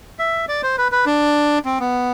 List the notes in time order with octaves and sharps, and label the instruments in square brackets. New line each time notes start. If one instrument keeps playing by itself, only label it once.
[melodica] E5
D5
C5
B4
B4
D4
C4
B3